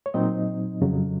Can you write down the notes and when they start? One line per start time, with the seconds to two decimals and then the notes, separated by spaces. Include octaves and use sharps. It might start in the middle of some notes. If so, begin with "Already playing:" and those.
0.06 C#5
0.14 A#2 F#3 C4 D#4 D#5
0.81 F2 C#3 F#3